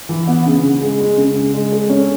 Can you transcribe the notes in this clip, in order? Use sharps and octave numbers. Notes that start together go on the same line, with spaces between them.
E3
B3
C#3
C#3
G#3
G#3
C#3
C#3
G#3
A4
C#4